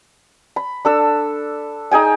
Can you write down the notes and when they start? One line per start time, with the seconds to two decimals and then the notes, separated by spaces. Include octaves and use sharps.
0.56 B5
0.85 D4 A4 E6
1.91 D#4 G#4 G5 G#5